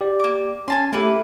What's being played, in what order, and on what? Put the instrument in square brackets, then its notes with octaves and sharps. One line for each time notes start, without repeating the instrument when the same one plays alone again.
[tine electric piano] G4 D5
[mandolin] A#3 D6
[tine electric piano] C#4 [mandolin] G#5 A5 C6
[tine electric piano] A3 G4 A4 [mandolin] A#3 E4 B4